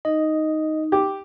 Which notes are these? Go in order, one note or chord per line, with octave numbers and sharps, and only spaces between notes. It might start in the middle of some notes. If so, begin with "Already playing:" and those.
D#4 D#5
G4